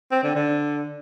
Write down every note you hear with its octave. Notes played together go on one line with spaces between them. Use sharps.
C4
D3
D3